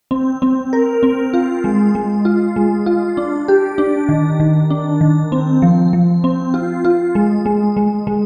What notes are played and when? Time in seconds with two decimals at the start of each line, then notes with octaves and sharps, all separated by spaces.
0.11 C4
0.42 C4
0.73 A#4
1.03 C4
1.33 F4
1.64 G#3
1.95 G#3
2.25 F4
2.56 G#3
2.86 F4
3.17 D4
3.48 G4
3.78 D4
4.09 D#3
4.40 D#3
4.70 D4
5.01 D#3
5.32 C4
5.62 F3
5.93 F3
6.24 C4
6.54 F4
6.85 F4
7.15 G#3
7.46 G#3
7.77 G#3
8.07 G#3